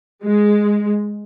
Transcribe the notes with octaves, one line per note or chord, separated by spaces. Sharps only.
G#3